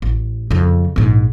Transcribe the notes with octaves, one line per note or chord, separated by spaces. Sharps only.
A1
F2 C#3
A#1 G#2